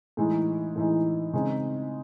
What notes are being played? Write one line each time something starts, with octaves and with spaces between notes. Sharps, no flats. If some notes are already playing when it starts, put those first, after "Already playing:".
A2 E3 G#3 D#4
A2 E3 G#3 D#4
C#3 G#3 C4 D#4